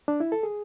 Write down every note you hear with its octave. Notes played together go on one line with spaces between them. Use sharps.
D4
E4
A4
G#4